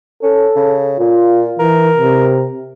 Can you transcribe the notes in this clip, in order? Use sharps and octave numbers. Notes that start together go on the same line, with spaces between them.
C#4 A4
C#3
A#2 F4
E3 A#4
C3